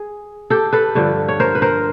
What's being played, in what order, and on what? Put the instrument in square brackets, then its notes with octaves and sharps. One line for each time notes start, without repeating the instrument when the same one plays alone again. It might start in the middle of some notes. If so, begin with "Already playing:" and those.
Already playing: [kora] G#4
G4 A4
A4 B4
G2 D3 F3
C#5
A#4 C5
B4
A#4 C5